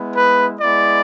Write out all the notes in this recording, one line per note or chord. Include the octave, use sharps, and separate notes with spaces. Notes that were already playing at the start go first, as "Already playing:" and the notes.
Already playing: G#3 B3 E4
B4
G#3 B3 E4 D5